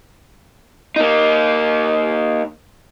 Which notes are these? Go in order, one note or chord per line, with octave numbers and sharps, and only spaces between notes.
A#3 D#4